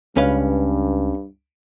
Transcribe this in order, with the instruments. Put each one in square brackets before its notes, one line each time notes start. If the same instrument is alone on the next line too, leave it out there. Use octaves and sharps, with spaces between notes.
[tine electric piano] C#2 [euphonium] G2 [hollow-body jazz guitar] C#4 B4 F5